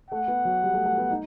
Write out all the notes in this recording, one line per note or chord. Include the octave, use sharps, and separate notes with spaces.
A3 F#5
B3
F#3
G3
A3
A3
B3
D#4